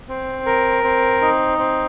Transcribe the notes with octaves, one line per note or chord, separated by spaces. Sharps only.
C4
A#4
C4
D#4
C4